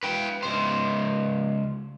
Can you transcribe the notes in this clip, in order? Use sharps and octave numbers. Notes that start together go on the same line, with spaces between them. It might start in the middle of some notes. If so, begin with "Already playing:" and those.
B4 G5
C#2 C5